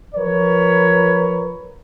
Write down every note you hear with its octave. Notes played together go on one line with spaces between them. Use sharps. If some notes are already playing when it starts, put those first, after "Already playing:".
F3 A#4 B4 C#5